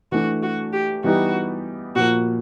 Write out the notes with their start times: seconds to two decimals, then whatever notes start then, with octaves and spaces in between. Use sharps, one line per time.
0.12 E3 A3 D4 F#4
0.43 F#4
0.73 G4
1.04 E3 G3 B3 D#4 F#4 G4
1.95 A#2 F3 A#3 F#4